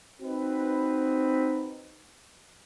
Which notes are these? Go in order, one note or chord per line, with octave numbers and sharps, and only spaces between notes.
C4 D#4 F#4 B4